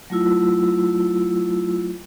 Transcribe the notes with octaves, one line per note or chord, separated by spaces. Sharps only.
F#3 A3 E4 F4 E6